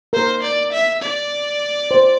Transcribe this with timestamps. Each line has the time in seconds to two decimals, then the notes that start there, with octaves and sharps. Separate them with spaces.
0.13 A#4 C5
0.42 D5
0.72 E5
1.02 D5
1.91 C5